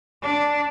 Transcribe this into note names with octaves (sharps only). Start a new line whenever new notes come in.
D4